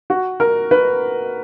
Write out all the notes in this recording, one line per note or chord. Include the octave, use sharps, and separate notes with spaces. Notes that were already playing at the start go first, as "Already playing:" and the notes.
F#4
A#4
B4